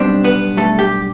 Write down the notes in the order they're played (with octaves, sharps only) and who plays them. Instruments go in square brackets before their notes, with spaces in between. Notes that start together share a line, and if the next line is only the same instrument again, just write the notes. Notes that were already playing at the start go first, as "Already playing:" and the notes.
Already playing: [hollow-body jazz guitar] B1 B2 G3 C4 D4
B3 B4
A3 A4
G4